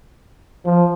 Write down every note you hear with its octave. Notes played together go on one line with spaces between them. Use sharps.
F3